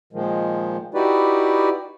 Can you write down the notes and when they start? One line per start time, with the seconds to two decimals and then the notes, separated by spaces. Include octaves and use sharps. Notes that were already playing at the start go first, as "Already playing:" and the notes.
0.13 A#2 D#3 F3 G#3
0.94 D#4 E4 F#4 G4 B4 D5